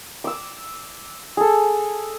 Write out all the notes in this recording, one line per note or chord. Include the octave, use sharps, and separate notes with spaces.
D6 E6
G#4 A4